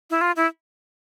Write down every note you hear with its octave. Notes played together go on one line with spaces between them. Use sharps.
E4
F4
E4